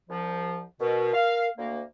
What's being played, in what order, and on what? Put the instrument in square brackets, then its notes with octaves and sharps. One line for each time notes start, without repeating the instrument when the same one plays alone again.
[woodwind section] C2 F3
[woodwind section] B2 [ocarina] A#4
[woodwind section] F5
D2 A#3